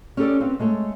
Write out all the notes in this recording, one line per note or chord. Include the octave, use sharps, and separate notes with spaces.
C#4 G4 A4 D5
C4 B4 C5 F5
G#3 A3 A4 C#5